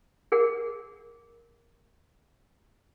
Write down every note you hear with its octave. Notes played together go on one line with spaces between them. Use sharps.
G#4 A#4 F#5